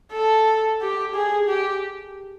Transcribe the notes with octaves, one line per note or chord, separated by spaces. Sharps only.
A4
G4
G#4
G4